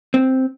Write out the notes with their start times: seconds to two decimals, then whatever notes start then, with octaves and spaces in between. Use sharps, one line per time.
0.14 C4